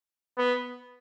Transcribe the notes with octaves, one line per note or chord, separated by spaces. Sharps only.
B3